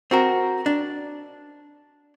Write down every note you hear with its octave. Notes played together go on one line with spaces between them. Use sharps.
C4 F#4 A#4
D4